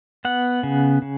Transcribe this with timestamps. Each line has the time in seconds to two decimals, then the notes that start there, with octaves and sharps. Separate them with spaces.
0.25 B3 F#5
0.63 C#3
1.02 C#3